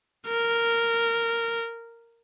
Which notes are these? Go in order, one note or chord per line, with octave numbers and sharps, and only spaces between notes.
A#4